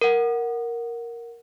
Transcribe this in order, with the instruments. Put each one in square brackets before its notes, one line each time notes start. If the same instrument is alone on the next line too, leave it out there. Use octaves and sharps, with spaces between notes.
[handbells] A#4 F#5